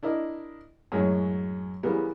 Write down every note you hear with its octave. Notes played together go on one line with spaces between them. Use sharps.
D4 E4 A#4 D#5
F#2 A2 F#3 G#3 C#4
C#3 E3 G3 B3 A#4